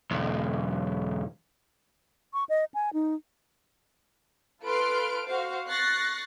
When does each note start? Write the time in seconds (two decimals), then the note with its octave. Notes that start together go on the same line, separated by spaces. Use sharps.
0.11 B1 E2
2.34 C#6
2.49 D#5
2.74 G#5
2.94 D#4
4.63 F4 A4 B4 C6 F6 D7
5.26 F#4 C5 F5
5.67 C#6 F#6 A6 A#6 C7